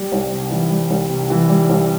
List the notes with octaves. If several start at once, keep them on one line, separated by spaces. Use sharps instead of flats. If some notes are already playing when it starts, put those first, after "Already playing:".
Already playing: G3
C2
C3
E3
G3
C2
C3
E3
G3
C2